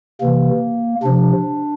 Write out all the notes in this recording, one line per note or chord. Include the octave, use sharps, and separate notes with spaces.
C3 E3 A#3
C3 F3 D4